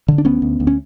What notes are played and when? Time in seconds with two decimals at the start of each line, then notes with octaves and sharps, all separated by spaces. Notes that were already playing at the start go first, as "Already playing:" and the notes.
0.08 D3
0.18 D4
0.25 D2 B3 C#4
0.42 D2
0.60 D2
0.67 C#4